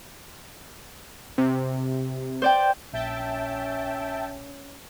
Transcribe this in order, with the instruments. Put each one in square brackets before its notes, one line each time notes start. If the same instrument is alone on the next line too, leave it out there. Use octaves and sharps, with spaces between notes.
[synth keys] C3
[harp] C5 D5 G5
[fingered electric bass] A#1 [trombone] C#4 [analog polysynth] E5 G5 A5